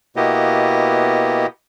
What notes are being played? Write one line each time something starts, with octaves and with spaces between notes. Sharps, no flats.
B2 A#3 B3 E4 G4 D#5